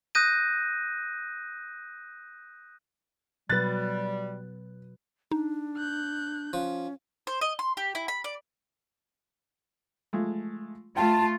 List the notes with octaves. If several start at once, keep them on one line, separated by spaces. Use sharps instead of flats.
D#6 F#6 G6 A#6 D#7
B2 F#3 G3 B4 F#6 A6
D4 D#4
F#6 G6
F3 C#4
C5
D#5
C6
G4
E4
B5
D5
F3 G#3 A3
A3 F4 G5 A5